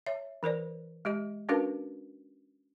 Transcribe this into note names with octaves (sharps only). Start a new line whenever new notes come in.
C#5 E5
E3 A#4 C5 D5
G#3 G4 D#5
C#4 D4 F#4 A#4 B4 F5